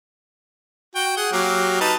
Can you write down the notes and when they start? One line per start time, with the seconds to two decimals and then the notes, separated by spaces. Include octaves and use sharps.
0.95 F#4 G5
1.17 G#4 F#5
1.33 F#3 A#3 G4
1.81 D#4 B4 A5